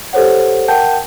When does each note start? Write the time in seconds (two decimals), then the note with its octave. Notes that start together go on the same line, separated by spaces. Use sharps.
0.13 G4 A4 C5 C#5 F#5
0.68 A#4 F#5 G5 A5 G6